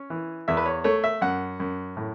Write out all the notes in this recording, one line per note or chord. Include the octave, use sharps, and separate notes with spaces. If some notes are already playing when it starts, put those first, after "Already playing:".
Already playing: C#4
E3
E2 E5
B4
C#5
A3 C#5
E5
F#2 F#5
F#2
A2